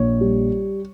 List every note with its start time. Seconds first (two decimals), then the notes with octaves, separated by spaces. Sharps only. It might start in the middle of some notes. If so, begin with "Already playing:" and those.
Already playing: A#1 C#5
0.21 G3